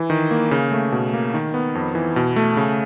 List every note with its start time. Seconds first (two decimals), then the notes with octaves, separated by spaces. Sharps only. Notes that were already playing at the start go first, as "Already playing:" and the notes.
Already playing: E3
0.10 D#3
0.31 A#3
0.51 C#3
0.72 A3
0.92 B2
1.14 A#3
1.34 D#3
1.54 B3
1.75 F2
1.95 E3
2.16 B2
2.36 A3
2.57 C#3